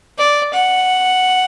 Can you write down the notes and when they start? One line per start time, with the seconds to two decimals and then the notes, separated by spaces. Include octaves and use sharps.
0.18 D5
0.54 F#5